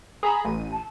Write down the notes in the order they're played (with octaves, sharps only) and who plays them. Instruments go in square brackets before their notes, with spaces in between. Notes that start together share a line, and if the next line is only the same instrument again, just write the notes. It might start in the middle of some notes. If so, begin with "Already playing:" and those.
[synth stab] G#4 A#5 B5
A1 D#7
[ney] A5